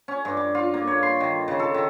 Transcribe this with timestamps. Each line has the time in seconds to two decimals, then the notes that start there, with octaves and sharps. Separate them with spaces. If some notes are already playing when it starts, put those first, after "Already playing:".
0.08 C#4
0.25 G2
0.37 D6
0.55 F4
0.74 A#3
0.87 C#5
1.03 C6
1.20 D#3
1.48 C#3
1.59 A4
1.74 D#3